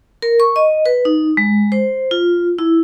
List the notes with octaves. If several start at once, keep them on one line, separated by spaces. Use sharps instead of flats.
A#4
C#6
D#5
B4
D#4
G#3
C5
F4
E4